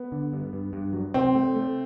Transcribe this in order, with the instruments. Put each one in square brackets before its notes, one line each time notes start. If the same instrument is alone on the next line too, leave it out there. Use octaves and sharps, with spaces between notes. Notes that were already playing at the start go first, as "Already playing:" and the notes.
Already playing: [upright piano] B3
[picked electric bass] D3
G2
G2
G2
F#3
[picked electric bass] C3 [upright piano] C4
[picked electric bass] A3
A3